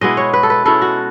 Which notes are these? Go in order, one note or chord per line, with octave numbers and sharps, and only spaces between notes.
B2 G#3 B3 E4 D#5
C#5
B4
A4
B4
B2 G#3 C#4 E4 A4
F#4